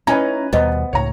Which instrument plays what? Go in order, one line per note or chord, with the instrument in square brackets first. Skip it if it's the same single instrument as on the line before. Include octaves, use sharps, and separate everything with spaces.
[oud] C#4 D#4 [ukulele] E4 [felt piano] B4 G#5 A#5
[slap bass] D#2 B2 G3 [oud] B3 [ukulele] C5 D#5
[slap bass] C#2 A2 [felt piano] C#5 A#5